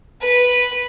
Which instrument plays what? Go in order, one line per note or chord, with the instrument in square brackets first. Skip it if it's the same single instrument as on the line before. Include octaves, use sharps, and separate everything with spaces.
[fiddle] B4